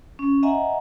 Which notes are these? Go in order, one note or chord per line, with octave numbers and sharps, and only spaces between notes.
C#4
D#5 E5 F#5 G#5 A#5